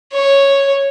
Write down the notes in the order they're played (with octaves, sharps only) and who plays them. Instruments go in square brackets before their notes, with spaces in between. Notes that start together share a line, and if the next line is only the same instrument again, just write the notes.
[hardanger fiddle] C#5